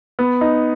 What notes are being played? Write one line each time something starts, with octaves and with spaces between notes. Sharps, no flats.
B3
D#4